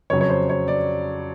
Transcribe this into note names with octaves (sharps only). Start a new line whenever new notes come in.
F2 C#3 F#3 C#5
C#5
C5
C#5
D5